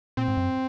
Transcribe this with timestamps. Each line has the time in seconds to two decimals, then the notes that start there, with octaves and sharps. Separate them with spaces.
0.17 A#2 C4
0.28 G#2
0.37 F#2